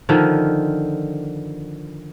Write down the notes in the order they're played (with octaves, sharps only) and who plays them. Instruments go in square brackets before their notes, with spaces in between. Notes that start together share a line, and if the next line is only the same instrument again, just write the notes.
[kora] D3 D#3 F3